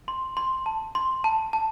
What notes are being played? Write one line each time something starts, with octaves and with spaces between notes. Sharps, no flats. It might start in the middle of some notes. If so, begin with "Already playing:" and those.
C6
C6
A5
C6
A5
A5